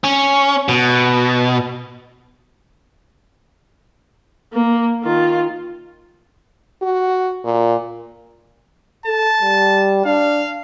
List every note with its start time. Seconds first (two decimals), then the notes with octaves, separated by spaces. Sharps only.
0.04 C#4
0.68 B2
4.53 A#3
5.03 D#3 F4
6.82 F#4
7.45 A#2
9.06 A4 A5
9.42 G3
10.05 D4 F5